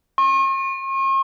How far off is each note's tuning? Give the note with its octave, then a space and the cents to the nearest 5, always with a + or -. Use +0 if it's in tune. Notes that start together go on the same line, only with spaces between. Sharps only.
C#6 -45